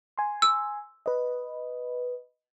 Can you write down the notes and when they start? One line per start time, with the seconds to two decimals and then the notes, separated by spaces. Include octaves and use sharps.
0.18 G#5 C6
0.42 E6
1.06 B4 D#5